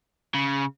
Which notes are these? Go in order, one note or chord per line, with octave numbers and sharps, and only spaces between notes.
C#3